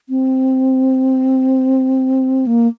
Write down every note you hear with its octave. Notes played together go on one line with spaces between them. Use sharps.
C4
A#3